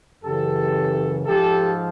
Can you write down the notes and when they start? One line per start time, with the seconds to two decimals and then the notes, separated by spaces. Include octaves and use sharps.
0.23 F#2 C#3 E3 G4 A4
1.25 G#2 F3 G4 A4